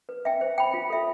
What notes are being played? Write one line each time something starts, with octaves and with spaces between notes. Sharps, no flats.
B4
E5 G5
C5
G5 B5
F4
A4 E5